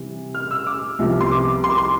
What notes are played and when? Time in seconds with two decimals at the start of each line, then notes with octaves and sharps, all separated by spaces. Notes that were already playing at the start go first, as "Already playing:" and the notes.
Already playing: C3 E3 G3
0.34 F6
0.51 E6
0.67 D6
0.99 C2 C3 F3 B3
1.21 C6
1.31 D6
1.64 C6
1.71 D6
1.78 C6